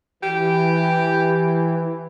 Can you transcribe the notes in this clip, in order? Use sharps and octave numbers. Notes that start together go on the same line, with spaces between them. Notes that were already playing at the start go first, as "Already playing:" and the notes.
E3 G4